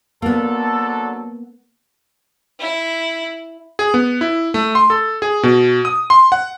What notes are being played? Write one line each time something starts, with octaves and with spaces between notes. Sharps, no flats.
D3 F#3 A#3 B3 A4
E4
G#4
B3
E4
A3
C6
A4
G#4
B2
D#6
C6
F#5